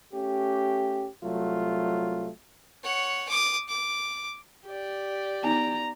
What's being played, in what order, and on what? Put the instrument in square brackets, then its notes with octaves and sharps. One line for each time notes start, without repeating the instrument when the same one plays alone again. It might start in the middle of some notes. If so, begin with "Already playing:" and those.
[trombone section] A3 C#4 G4
C2 F#3 A3 F4
[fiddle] C#5 F#5
D6 D#6
D6
[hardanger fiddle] G4 D5
[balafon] B3 D#4 [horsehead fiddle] A#5